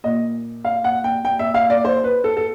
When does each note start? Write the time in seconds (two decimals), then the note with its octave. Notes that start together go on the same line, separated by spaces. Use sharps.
0.04 A#2 D#5
0.65 F5
0.84 F#5
1.04 G5
1.25 G5
1.39 E5
1.54 F5
1.70 D5
1.85 C5
2.04 B4
2.24 A4
2.37 A4